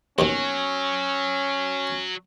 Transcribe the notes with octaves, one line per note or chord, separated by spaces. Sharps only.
D#2 B2 D#3 F#3 C#4